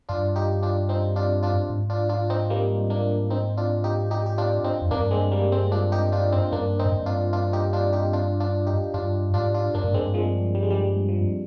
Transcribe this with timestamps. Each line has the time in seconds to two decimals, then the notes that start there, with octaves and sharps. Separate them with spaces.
0.09 G2 D4 F4
0.36 D#4 G4
0.63 D4 F4
0.89 C4 D#4
1.16 D4 F4
1.43 D4 F4
1.70 G#2
1.90 D4 F4
2.09 D4 F4
2.30 C4 D#4
2.50 G3 A#3
2.90 A#3 D4
3.30 C4 D#4
3.57 D4 F4
3.84 D#4 G4
4.11 D#4 G4
4.26 G4
4.38 D4 F4
4.64 C4 D#4
4.82 F2
4.91 G2 A#3 D4
5.11 G#3 C4
5.31 G3 A#3
5.52 G#3 C4
5.72 D4 F4
5.92 D#4 G4
6.12 D4 F4
6.32 C4 D#4
6.52 G2 A#3 D4
6.79 C4 D#4
6.86 G#2
6.92 G2
7.06 D4 F4
7.33 D4 F4
7.53 D#4 G4
7.73 D4 F4
7.93 D#4 G4
8.13 D4 F4
8.40 D4 F4
8.67 D#4 G4
8.94 G2 D4 F4
9.34 G#2 D4 F4
9.54 D4 F4
9.74 G2 A#3 D4
9.84 G#2
9.94 G2 G#3 C4
10.14 F3 G#3
10.55 G3
10.63 G#3
10.71 G3
11.08 F3